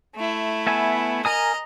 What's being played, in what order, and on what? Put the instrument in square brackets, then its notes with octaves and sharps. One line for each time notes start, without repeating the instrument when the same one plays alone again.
[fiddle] A3 E4
[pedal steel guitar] B3 E5 G#5
[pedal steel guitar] A#4 G#5 D#6 [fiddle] D#5 A#5